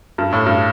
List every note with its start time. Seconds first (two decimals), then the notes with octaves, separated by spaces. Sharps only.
0.18 G2
0.33 A2
0.46 G2